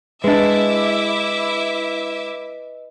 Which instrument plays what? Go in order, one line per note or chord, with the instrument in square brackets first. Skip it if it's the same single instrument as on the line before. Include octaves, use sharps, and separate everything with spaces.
[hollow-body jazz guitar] G#3 D4 [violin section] E4 E5 D6 [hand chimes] B4 D#5